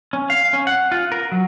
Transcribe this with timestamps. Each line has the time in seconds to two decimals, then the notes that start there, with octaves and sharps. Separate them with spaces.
0.13 C#4
0.30 F5
0.53 C#4
0.67 F#5
0.92 F4
1.12 A#4
1.32 F#3